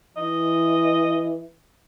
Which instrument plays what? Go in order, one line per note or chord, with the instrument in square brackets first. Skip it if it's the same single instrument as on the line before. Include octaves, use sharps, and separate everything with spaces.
[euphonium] E3 [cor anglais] D#5